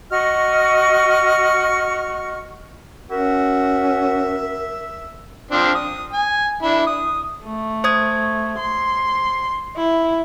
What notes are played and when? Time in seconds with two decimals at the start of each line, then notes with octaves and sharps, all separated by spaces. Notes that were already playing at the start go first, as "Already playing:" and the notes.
0.11 F#4 D#5 C#6 F6
3.11 C#4 F#4 A#4 E5
5.51 F3 C4 D4
5.75 D#6
6.13 G#5
6.62 D4 E4
6.87 D#6
7.44 A3
7.84 C5 D#6 G#6
8.58 C6
9.77 E4